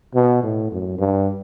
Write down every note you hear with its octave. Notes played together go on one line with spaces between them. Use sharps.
B2
A2
F#2
G2